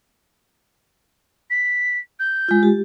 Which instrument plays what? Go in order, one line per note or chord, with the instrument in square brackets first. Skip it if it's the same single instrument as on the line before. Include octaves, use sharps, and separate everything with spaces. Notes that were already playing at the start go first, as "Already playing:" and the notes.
[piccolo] B6
G6
[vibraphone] G#3 F4
G4